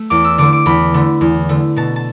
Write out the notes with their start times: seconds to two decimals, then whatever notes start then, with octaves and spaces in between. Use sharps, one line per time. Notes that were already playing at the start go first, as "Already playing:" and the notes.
Already playing: A3
0.10 E2 D6
0.25 E6
0.38 D3 A3 D6
0.53 D6
0.66 E2 B5
0.94 D3 A3
1.21 E2
1.49 D3 A3
1.76 B2 A5
1.96 A5